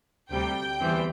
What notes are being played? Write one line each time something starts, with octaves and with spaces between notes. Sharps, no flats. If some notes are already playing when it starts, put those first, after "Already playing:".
D2 C3 G3 G5
E2 E3 G3 C4